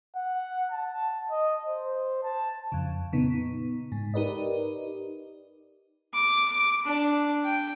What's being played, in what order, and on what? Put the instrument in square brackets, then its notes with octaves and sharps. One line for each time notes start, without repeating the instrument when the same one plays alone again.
[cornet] F#5
A5
D#5
C5
A5
[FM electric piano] F2 C#3
A#2 C#3 B3 D#4
G#2
D#4 G4 A#4 B4 D5 D#5
[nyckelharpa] D6
D6
D4
G5